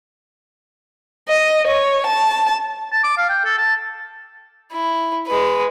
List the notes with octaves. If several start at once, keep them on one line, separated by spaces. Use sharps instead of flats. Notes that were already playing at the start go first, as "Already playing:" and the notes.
D#5
C#5
A5
A5
D6
F5
G5
A4
A5
E4
G#3 B4